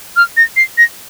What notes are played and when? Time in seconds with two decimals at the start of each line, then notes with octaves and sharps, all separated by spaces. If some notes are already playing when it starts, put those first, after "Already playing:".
0.16 F6
0.37 A#6
0.56 C7
0.78 A#6